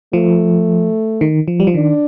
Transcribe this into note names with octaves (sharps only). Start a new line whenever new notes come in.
F3 A3
D#3
F3
G3
F3
D#3 D4